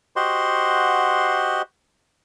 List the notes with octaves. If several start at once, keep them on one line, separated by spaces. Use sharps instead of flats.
F#4 G4 C5 D#5 F#5 C6